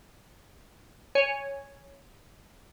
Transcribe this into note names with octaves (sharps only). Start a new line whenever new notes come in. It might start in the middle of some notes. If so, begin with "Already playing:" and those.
C#5 G#5